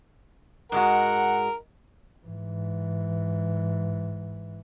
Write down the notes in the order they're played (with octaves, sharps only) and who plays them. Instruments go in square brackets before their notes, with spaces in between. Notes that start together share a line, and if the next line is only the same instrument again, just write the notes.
[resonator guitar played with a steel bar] G#2 G#3 F#4 [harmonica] A#4 [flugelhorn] F#5
[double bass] G#2 E3